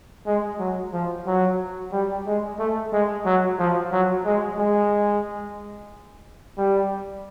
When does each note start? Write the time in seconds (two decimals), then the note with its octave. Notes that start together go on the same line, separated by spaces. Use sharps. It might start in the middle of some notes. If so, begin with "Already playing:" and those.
0.26 G#3
0.59 F#3
0.93 F3
1.27 F#3
1.93 G3
2.27 G#3
2.59 A3
2.93 G#3
3.26 F#3
3.59 F3
3.92 F#3
4.25 G#3
4.59 G#3
6.58 G3